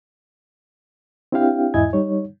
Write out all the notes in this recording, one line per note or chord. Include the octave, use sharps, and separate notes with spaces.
C4 D4 E4 G4 F5 G5
E2 G#2 E4 D#5 G#5 G#6
G3 D#4 C#5